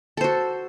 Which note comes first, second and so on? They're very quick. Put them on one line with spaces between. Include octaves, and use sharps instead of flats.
A4 C5 F#4